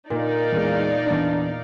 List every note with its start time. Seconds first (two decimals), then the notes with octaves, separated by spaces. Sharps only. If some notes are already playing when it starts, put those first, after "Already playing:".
0.10 A#2 D#4 D5 F5
0.52 E2 G#3
1.07 E2 D4 A6